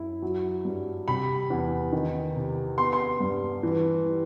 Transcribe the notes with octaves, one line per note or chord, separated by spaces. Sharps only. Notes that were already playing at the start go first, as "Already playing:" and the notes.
Already playing: F#2 E4
F#3
G2
C3 B5
E2
D#3
C3
B3 C6
C6
G2
E3
G3